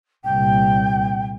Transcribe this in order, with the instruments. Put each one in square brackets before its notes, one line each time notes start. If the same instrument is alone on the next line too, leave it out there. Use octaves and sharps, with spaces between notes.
[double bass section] C2 A#2 [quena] G5